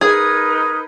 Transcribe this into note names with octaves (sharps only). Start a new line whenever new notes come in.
D#4 G#4 A#4 B4 D#6 G#6